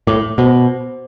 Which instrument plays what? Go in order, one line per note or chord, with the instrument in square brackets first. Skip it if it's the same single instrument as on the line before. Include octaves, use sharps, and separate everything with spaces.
[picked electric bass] A2 [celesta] D6
[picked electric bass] B2 [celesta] C5
[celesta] C5